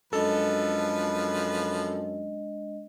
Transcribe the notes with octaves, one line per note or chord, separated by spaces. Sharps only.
F#2 F3 G#3 D4 A4 B4 D#5